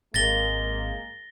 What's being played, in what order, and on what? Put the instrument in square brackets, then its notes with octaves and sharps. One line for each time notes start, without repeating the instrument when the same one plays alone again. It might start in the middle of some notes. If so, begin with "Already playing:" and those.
[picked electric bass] G#1 [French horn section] G#3 A#3 [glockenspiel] A6 A#6 G7